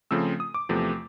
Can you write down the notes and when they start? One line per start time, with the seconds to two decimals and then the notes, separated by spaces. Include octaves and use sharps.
0.11 C#3 F3 A3 C4 E6
0.40 D#6
0.54 D6
0.69 E2 C3 F3 A3